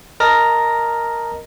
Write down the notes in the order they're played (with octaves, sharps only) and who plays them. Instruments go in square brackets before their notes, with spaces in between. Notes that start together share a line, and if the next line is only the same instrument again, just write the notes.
[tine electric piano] A#4 D#5 A5 A#5 F6 A#6